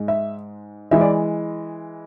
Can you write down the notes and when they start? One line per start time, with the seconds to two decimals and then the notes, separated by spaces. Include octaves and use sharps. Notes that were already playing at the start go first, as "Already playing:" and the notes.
Already playing: G#2 G#3
0.08 E5
0.91 E3 G#3 E5
1.01 D5